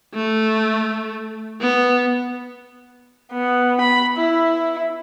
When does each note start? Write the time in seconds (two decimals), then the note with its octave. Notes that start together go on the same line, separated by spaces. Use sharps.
0.14 A3
1.60 B3
3.33 B3
3.81 B5
4.17 E4